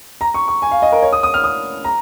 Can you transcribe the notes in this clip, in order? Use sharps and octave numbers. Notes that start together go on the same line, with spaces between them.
A#5
C#6
C#6
G#5
F5
D#5
A#4
C#5
D#6
D#6
F6
D#6
A#5